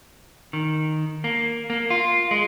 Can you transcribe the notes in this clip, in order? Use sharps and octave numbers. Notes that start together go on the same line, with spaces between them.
D#3
A#3
A#3
F4
G#3